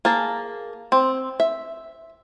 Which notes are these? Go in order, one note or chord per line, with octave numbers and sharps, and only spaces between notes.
A#3 G#4 A5
C4
E5